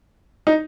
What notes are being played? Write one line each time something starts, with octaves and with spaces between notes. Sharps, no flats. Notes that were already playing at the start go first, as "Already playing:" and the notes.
D#4